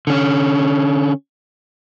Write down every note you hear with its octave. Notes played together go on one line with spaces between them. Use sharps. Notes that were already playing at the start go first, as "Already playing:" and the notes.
D3 C#4